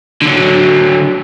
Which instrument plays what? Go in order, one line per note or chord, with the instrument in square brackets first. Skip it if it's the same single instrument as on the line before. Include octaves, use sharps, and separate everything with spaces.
[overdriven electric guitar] D3 F#3